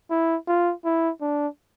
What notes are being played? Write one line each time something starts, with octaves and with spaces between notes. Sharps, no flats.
E4
F4
E4
D4